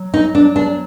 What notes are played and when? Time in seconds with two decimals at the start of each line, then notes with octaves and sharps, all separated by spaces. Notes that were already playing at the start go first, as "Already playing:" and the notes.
Already playing: F#3
0.14 D#4
0.35 D4
0.56 D4